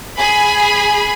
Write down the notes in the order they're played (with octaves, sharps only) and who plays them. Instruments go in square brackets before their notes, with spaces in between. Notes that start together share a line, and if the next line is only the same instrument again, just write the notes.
[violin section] G#4 G#5 B5